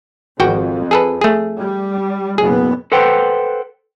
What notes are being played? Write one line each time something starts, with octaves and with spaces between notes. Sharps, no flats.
G#1 F2 F#4 G5
G#4 A4 B4
A3 G#4
G3
F#1 B2 B3 G#4
A4 B4 C5 F#5 G5